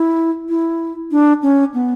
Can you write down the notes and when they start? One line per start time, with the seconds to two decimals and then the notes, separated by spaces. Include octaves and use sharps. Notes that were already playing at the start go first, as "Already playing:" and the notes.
Already playing: E4
0.49 E4
1.11 D4
1.43 C#4
1.74 B3